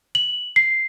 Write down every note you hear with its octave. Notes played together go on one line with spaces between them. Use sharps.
F#7
C7